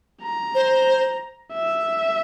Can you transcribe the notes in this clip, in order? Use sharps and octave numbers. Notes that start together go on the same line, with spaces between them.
A#5
C5
E5